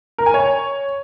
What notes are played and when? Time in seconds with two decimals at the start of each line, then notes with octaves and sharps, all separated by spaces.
0.18 A#4
0.26 G#5
0.34 C#5